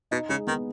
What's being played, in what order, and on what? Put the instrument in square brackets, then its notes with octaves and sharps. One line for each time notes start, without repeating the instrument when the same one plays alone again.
[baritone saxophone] B2 [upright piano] D#4
[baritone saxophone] C#3 [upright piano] G#3
[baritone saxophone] D#3 [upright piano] B3